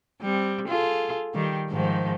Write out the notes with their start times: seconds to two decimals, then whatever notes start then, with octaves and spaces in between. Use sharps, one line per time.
0.22 G3 C4
0.68 F4 G#4 A4
1.34 D#3 G3
1.70 G#2 D#3 F3